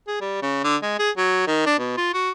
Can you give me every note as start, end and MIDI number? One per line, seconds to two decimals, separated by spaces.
0.07 0.21 68
0.21 0.39 55
0.42 0.62 49
0.64 0.76 50
0.82 0.94 56
0.99 1.10 68
1.17 1.44 54
1.47 1.64 51
1.66 1.78 62
1.79 1.97 47
1.97 2.13 65
2.14 2.31 66